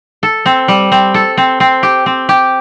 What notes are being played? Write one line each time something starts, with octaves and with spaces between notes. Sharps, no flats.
A4
C4
G3
C4
A4
C4
C4
G4
C4
G4